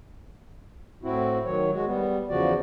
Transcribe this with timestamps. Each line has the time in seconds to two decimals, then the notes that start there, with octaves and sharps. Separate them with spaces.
1.03 A2 C4 E4 F#4
1.45 D#3 F#3 C#5
1.72 G#3 F#4
1.86 G3 B3
2.29 E2 C#3 F3 F#4 D5